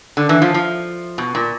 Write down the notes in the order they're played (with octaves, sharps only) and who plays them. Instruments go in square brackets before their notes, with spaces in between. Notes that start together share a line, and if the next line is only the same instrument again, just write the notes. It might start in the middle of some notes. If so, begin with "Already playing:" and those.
[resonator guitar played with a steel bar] D3
E3
F3
F3
B2
A#2